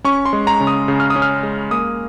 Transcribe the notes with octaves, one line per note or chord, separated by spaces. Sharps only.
C#4 C#6
C6
G#3
A#5
C#3
D#6
C#3
F6
D#6
C#4
F6
G#3
A#3 D#6